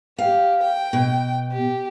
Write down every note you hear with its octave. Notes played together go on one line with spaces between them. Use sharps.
G4 F5
G5
B2
G4